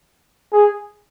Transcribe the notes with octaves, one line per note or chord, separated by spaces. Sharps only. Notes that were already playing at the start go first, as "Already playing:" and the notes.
G#4